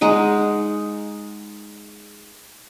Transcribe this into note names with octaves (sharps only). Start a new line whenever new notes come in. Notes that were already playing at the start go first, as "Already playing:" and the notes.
G#3 D#4 F#5